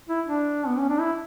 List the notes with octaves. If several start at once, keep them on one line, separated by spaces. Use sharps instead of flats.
E4
D4
B3
C#4
D4
E4